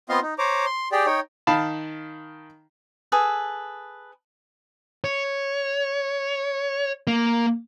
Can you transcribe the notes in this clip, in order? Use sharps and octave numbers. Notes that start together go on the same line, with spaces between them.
B3 C4 F4 D#5 F5 C6
D#4
C5 C#5 A#5 D6
C6
G4 G#4 D5 G5
D#4 C#5 G5
D#3 F5 A5 B5
G#4 A4 B4
C#5
A#3